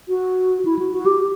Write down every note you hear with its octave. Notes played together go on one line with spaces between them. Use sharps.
F#4
E4
F#4
F#4
G4